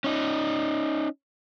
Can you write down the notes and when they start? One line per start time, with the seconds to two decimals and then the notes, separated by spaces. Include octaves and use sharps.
0.04 C#4 D#4